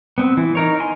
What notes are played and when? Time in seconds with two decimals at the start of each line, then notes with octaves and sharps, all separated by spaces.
0.18 B3 C4
0.37 E3
0.55 D#4 A#4 C#5
0.80 G#5 C6